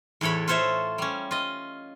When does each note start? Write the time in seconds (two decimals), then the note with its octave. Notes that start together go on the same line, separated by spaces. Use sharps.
0.21 E2 A2 A4 C#5 B5
0.48 F4 A4 C5 C#5 E5
0.98 G3 C#4
1.31 F4 D#5